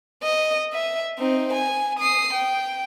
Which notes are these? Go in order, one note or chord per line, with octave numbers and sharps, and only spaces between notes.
D#5
E5
C4 D#4
G#5
D#6 C7
G5